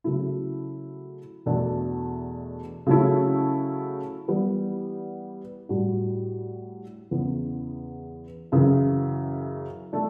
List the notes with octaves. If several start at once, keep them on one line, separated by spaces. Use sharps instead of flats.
C#3 F#3 A3 E4
E2 B2 A3 D4
C#3 F#3 A3 C#4 E4
E3 G3 B3
A2 G3 D4 F#4
E2 C#3 E3 B3
F#2 C#3 E3
A3 D4